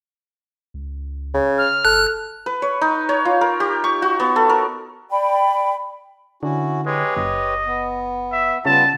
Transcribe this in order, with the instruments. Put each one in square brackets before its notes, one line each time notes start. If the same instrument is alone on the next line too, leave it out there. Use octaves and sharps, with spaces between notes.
[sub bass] C#2
[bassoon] C#3
[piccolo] F6
[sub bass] G1 [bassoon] A4 [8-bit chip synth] F#6
[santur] B4
C#5
D#4
C#5
F4
A#4
G4
C#6
F#4
B3
A4
A#4
[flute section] D5 G5 B5
[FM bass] D3 [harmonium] C#4 E4 F#4
[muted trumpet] G#3 [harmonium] G4 B4 C#5
[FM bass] F#1 [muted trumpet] D#5
[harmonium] B3
[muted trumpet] E5
[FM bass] C#3 [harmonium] G3 B3 F4 [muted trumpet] A5